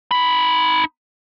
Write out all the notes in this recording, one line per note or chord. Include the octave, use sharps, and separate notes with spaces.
D#4 B5